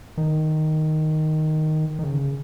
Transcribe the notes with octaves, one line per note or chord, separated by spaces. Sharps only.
D#3
D#3
C#3